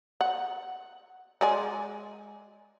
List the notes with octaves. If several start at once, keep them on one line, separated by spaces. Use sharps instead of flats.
F#5
G#3 D5 G#5